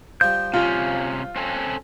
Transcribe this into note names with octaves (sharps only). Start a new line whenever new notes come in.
F3 G3 G6
C3 C#4 F4
C4 C#4 A4